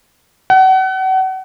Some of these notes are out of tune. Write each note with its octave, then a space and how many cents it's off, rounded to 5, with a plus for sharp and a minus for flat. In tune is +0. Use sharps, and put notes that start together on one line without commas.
F#5 +35